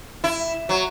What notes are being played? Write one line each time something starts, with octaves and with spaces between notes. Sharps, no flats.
E4
F#3